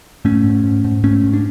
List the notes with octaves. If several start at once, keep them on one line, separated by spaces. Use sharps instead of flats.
G#2 A3 C#4
G#2
G#2
G#2
G#2 A3 C#4
G#2
D4